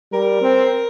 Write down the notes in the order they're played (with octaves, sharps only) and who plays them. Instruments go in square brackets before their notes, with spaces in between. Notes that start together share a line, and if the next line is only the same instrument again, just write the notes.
[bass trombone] G3 [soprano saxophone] A#4
[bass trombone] C4